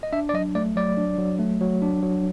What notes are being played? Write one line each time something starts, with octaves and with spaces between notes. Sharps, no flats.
D#5
D4 E5
D5
F#3 D#5
A3 D5
F#3 D5
D4
F#3
A3
F#3
D4
F#3